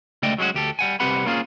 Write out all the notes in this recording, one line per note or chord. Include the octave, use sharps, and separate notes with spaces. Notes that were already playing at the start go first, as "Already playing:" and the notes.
C#2 D3 A3 D5 D#5 G5
F#3 G#3 C#4 F4 F#4
D2 G4 A4
G3 F#5 G#5
C2 C4 G4 B4 F#5 B5
A#3 C#4 F4 G#4